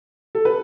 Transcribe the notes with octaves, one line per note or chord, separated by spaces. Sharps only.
A4
B4